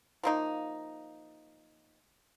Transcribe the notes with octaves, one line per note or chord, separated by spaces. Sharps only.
F3 A#3 D#4